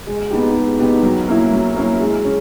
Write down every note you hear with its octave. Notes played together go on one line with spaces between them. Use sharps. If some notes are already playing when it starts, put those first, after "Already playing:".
G#3
B3 D#4 G4
G#3
B3 D#4 G4
F#3
A#3 C#4 E4
F#3
A#3 C#4 E4
G#3
C#4